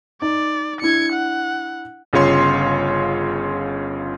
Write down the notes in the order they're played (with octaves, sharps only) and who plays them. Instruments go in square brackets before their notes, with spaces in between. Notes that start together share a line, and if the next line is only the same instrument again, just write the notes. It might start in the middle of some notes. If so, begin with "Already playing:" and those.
[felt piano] D#4 [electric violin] D5
[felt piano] D4 E4 [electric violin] G#6 C#7
[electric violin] F#5
[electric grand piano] G1 C#3 F4 C#5 C6